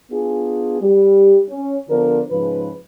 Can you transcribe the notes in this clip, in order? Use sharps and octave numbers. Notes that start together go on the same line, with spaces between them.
B3 D4 F4 G#4
G3
C#4
D3 F3 B3 D4 A#4 C5
G#2 C#3 F3 B4